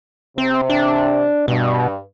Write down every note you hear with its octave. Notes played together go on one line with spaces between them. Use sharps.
C3 C4
D4
G2 B2